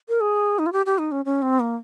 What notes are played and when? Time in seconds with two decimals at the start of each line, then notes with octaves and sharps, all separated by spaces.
0.09 A#4
0.21 G#4
0.59 D#4
0.66 F4
0.72 G4
0.86 G4
0.98 D#4
1.12 C#4
1.25 C#4
1.42 C4
1.60 A#3